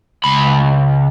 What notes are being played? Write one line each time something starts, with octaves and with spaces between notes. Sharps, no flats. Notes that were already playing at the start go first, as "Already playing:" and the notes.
C#2 B5